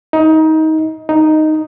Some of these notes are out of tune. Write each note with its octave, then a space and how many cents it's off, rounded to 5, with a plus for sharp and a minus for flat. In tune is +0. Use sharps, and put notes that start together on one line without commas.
D#4 +25
D#4 +0